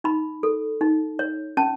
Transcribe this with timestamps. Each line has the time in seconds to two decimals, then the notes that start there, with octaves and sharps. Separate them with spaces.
0.04 D#4 B5
0.43 A4
0.81 D#4
1.19 C#5
1.57 C#4 A5